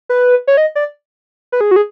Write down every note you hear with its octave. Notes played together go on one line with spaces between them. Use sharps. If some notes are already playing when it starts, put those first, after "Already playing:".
B4
C#5
D#5
D5
B4
G#4
F#4
G#4